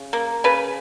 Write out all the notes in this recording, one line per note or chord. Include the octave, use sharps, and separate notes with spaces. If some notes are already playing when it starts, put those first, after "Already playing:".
Already playing: C#3
A#3
C#3 B4